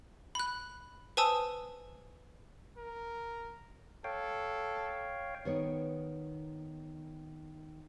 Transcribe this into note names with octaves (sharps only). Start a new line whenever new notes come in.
B5 F#6
B4 C5 G#5 A5 D#6 E6
A#4
A4 C#5 F5 G5
D#3 B3 C#5